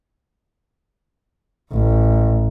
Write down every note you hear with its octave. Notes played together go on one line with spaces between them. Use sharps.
A1